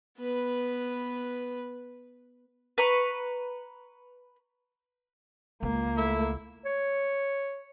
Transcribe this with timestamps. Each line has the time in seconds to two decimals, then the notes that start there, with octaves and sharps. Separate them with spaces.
0.19 B3 B4
2.78 B4 A#5 C#6
5.63 C#2 A#3
5.97 A3 E4 E5
6.65 C#5